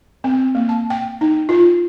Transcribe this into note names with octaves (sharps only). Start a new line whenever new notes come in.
C4
A#3
A5
G5
D#4
F4